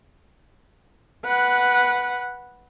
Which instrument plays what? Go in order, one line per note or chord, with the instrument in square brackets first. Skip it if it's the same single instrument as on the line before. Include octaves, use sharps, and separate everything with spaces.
[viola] B4 F#5